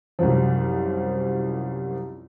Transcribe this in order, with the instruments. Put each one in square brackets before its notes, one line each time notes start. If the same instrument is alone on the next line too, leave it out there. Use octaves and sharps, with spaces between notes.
[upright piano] C2 F#2 F3